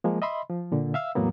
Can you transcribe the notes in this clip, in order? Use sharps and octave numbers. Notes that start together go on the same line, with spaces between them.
F3 G#3 A#3
D#5 E5 B5 C6
F3
A#2 D3
E5 F5 E6
E2 A2 F#3 A#3 B3